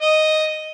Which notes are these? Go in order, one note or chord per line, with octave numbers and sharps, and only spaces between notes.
D#5